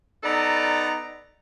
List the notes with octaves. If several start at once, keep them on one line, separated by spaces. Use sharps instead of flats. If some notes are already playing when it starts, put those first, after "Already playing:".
B3 D#4 A4 D5 A#5